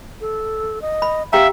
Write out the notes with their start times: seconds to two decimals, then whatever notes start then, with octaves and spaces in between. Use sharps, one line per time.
0.21 A4
0.82 D#5
1.02 B5
1.33 G4 E5 F5 G5 A#5